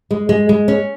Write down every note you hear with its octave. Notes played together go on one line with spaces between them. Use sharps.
G#3
G#3
G#3
C#4